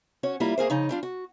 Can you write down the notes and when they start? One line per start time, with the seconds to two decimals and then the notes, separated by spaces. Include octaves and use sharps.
0.23 C#4 F#4 C#5
0.40 G3 A#3 E4 F4
0.58 A#3 G#4 A#4 C5
0.70 C#3 F3 D#4
0.89 G3 D4 F4
1.03 F#4